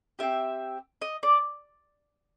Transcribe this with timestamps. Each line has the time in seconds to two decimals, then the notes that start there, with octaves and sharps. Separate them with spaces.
0.19 C4 E4 G4 E5
1.01 D#5
1.23 D5